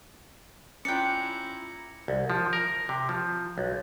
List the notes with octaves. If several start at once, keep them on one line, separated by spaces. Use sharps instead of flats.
C#4 E4 F4 D5 G5 A#5 C#7
C2
F3
A#4
C3
F3
B1